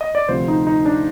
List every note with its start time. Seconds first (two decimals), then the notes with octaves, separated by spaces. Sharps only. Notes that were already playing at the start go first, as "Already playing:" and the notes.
0.01 D#5
0.15 D5
0.28 D2 C3 F3 C5
0.48 D#4
0.67 D#4
0.85 D4